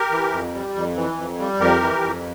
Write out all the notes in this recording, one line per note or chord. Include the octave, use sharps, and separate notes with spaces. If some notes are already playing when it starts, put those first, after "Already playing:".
Already playing: G4 A#4
E3
F2
G3
F2
E3
F2
G3
F2 G4 A#4
E3
F2